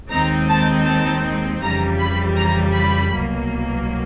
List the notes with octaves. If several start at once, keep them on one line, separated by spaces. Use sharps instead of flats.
D#2 D#3 G#3 C4 D#4 A#5
A5
A5
F2 C#3 E3 G3 A#5
B5
A#5
B5
C2 B2 F#3 A#3